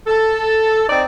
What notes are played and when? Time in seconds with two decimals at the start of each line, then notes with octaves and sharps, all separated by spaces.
0.07 A4
0.89 C4 D#4 D5